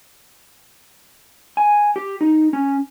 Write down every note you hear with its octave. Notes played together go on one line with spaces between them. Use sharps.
G#5
G4
D#4
C#4